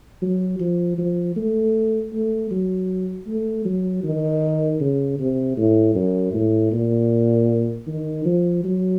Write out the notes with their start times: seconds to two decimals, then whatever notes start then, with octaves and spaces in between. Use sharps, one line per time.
0.22 F#3
0.60 F3
0.98 F3
1.36 A3
2.13 A3
2.51 F#3
3.27 A3
3.65 F#3
4.04 D#3
4.81 C#3
5.20 C3
5.57 A2
5.95 F#2
6.33 A2
6.73 A#2
7.87 D#3
8.25 F3
8.64 F#3